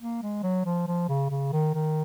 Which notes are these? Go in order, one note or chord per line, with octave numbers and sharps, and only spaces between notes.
A#3
G#3
F#3
F3
F3
C#3
C#3
D#3
D#3